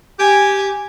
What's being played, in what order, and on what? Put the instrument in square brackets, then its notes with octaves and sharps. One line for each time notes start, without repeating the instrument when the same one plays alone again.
[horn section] G4 [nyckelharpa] G#5